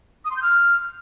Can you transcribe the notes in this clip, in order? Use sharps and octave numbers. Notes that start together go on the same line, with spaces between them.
D#6
C6
G6
F6